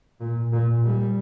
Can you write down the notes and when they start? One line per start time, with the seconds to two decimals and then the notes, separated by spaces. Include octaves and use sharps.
0.21 A#2
0.52 A#2
0.84 G3